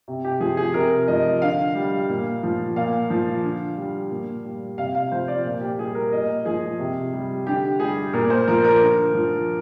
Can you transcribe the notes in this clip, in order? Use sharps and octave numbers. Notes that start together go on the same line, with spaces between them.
C3
G4
F3 G#4
G#4
C3 A#4
F3 D#5
D3 F5
G3
A#2
F3
A#2 F5
F3
D3
G3
A#2
G3
C3 F5
F5
F3 C5
D5
A#2
G4
G3 G#4
A#4
A#2 D#5
F3 G#4
C3
G3
D3 G4
G3 G#4
A#2 A#4
C5
F3 A#4
A#4
D3
F3